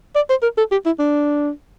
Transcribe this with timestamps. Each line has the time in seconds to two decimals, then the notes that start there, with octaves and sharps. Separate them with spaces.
0.16 D5
0.30 C5
0.43 A#4
0.58 A4
0.72 G4
0.86 E4
0.99 D4